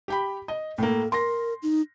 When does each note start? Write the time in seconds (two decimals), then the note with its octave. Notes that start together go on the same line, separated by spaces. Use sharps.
0.08 G4 G5 B5
0.48 D#5
0.78 A2 A#3 A4
1.12 A#4 C6 A#6
1.63 D#4